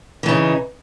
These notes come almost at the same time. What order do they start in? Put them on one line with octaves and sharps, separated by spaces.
E3 C#3 D#4